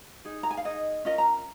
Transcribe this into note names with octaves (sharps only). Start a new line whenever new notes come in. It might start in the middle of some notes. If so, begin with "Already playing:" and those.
D#4 G#4
A#5
G#5
F5
D#4 G#4 D#5
C#4 F4 A#4 D#5
A#5